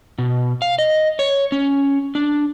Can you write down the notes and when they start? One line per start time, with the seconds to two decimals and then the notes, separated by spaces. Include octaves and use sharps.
0.18 B2
0.62 F5
0.79 D#5
1.19 C#5
1.52 C#4
2.15 D4